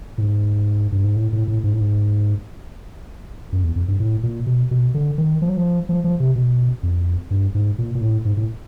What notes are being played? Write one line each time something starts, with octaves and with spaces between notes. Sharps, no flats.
A2
G#2
G2
G#2
A2
A2
A2
G#2
A2
G#2
F#2
E2
F2
G2
A2
A#2
B2
B2
D3
D#3
F3
F#3
F3
F3
F3
C3
B2
F2
G2
G#2
A#2
A#2
A2
G#2
A2